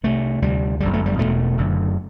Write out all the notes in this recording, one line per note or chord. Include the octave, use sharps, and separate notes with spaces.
C2 C3 A3
D2 C3 G3
G1 F#2 D3 G3
A3
G3
E1 E2 B2 A3
F#1 F#2 D3